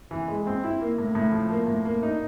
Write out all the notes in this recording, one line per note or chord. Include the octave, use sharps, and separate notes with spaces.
E3
G#3
C4
E4
A#3
A2
A2
F3
A#3
A2
A#3
D#4